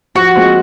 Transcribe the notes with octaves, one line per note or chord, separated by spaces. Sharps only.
F3 F#4
G#3 C4 F4